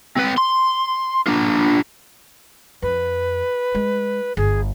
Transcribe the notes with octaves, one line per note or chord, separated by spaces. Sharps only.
C4 B4
C6
D4 F4
F2 B4
G#3
G1 G#4